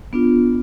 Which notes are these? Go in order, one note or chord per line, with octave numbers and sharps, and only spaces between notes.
B3 D4 F4